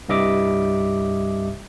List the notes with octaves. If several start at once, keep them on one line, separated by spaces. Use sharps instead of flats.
C2 G2 G3 D#5 E5 D6